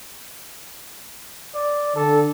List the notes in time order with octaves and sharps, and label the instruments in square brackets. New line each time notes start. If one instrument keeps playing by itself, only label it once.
[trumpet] D5
[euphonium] D3 [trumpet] A4